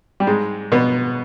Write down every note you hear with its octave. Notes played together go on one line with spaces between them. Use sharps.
G3
G#2 G#3
B2 B3